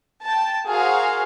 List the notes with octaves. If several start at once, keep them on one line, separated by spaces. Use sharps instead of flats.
G5 A5
F#4 G#4 A#4 C5 F5